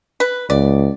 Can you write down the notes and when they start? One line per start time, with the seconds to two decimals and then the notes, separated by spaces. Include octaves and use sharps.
0.20 B4
0.50 C#2 D5